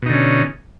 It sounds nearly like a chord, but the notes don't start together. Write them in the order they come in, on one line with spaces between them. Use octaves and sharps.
B2 D#4 D3 C#4